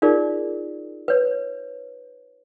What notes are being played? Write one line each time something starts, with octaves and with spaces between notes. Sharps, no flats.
D#4 F4 G#4 A#4 D5
B4 C#5